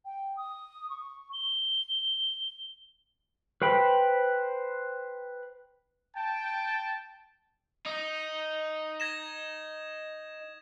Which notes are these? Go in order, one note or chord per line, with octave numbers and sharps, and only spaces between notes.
G5
D#6
C#6
G7
B4 C5 G5 B5
G5 A5
D#4 D#6
G#6 A#6 E7